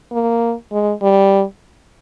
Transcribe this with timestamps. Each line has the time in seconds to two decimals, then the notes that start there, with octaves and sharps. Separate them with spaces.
0.11 A#3
0.72 G#3
1.02 G3